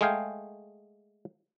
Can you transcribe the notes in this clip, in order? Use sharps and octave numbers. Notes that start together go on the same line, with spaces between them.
G#3 A3 G#4 F5 G5